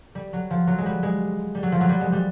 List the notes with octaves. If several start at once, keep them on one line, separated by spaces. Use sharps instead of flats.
G3
F#3
F3
F#3
G#3
G3
G#3
G3
F#3
F3
F#3
G3
G#3
G3